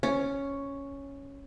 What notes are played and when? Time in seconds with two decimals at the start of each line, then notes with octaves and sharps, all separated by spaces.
0.03 C#4